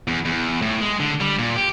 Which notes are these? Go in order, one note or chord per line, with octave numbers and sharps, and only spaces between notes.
E2
E2
A2
G#3
D3
G3
A#2
G4